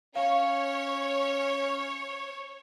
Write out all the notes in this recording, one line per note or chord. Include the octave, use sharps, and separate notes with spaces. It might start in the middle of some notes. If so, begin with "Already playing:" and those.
C#4 C#5 F5